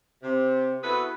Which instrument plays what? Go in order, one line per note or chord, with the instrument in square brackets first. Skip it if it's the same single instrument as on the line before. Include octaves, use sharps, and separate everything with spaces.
[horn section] C3
B3 E4 F#4 G#4 A4 B4